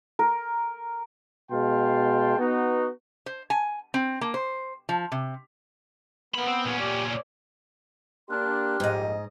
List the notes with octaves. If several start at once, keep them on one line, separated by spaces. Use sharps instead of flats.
A#4
B2 G#3 F5 G5 A5 C6
B3 D#4 F#4
C5
G#5
C4
A#3
C5
F3
C3
A#3 B3 B5
C4
A#2 C#4
G4 D5
D5
A#3 D4 G4 C6 F6 F#6
A#1 F2 G#2 D#5